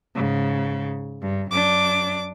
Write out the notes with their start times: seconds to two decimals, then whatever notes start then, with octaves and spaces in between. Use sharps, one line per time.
0.15 G#2 C#3
1.21 G2
1.51 F#2 D4 D6